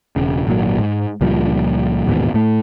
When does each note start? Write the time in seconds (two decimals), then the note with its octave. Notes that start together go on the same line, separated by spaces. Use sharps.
0.16 E1 C#3
0.47 G#1 A#2 F#3
0.78 G#2
1.21 C#2 A#2 F3 G3
2.06 A1 D#2 G#2 B2
2.34 A2 A3